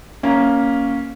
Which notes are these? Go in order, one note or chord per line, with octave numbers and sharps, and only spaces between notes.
A#3 C#4